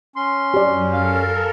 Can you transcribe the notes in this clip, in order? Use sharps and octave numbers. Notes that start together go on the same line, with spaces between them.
C#4 C6
F#2 G4 D5
A4 A#4 F5